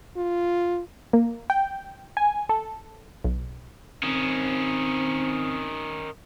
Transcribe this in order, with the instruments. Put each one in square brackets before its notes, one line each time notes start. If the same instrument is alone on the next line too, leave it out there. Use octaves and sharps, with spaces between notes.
[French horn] F4
[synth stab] A#3
G5
G#5
A4
B1
[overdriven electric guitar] D#3 C#4 [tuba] C4